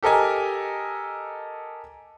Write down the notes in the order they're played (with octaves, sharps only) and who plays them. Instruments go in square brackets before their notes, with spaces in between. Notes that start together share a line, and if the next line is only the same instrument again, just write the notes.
[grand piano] G4 A4 A#4 D#5 G#5